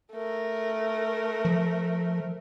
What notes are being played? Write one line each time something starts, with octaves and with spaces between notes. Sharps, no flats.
A3 A#4
F3